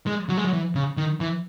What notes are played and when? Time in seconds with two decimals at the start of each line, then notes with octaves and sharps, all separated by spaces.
0.07 G#3
0.29 F#3
0.37 G#3
0.44 F#3
0.53 E3
0.75 C#3
0.97 D#3
1.20 E3